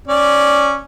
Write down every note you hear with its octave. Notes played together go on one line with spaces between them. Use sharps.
C#4 D5